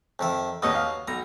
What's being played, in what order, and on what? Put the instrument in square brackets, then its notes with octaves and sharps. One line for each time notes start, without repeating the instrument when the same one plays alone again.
[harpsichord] F2 D#3 E5
[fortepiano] D#2 D#5 D#6 [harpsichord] F#3 B3
[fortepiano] F5
[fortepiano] B1 [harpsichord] A#5